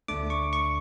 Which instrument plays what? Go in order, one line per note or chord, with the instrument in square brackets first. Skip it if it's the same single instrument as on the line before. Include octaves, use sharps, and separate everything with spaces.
[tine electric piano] D2 D3 A3 D4 D6
C#6
C#6